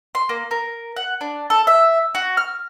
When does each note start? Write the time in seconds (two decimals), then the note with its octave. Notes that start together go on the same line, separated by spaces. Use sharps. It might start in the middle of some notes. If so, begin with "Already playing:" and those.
0.15 C6
0.29 A#3
0.51 A#4
0.96 F#5
1.21 D4
1.50 A4
1.67 E5
2.15 F#4
2.37 F6